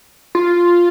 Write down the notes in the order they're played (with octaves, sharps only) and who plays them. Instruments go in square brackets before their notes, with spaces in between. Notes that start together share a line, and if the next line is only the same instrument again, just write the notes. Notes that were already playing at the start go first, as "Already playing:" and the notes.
[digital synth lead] F4